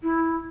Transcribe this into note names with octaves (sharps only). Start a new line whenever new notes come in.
E4